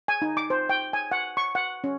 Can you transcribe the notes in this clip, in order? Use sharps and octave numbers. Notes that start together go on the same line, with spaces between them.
G#5
D#4
D6
C5
G5
G#5
F#5
C#6
F#5
C#4